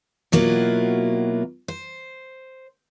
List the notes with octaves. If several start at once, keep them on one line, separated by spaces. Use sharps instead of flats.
B2 F#3 A#3 E4 F4
C5